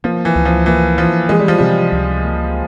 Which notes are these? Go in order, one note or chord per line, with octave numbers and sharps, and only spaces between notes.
F3 A#3
E3
C#2
F3
E3 A#3
E3 F3
E3 G#3
G3
F3
C3 G3
C#2
A#3